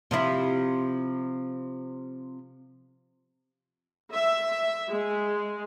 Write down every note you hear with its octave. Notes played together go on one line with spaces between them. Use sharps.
C3 F3 E4
E5
G#3